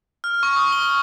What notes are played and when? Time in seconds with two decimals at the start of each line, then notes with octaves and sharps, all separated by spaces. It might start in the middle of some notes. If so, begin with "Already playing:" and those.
0.24 F6
0.43 C#6
0.56 D#6
0.72 G7